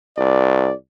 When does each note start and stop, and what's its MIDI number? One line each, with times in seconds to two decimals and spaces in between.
0.17 0.72 36
0.17 0.74 74